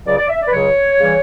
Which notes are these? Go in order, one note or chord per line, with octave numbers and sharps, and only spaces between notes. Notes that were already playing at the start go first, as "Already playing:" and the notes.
C#2 C#3 F#3 D5
D5
E5
D5
B4
C#2 C#3 F#3 C#5
C#3 E3 G3